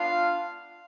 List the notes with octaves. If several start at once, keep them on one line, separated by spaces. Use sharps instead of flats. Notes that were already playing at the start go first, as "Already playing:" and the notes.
Already playing: B3 D4 F4 F5